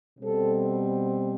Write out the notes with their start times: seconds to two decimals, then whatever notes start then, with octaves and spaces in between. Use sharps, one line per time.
0.19 B2 G3 C4 A4